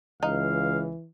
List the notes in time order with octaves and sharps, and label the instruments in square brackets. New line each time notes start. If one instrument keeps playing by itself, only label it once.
[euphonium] C#2 [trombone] E3 [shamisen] D#4 [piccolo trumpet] F5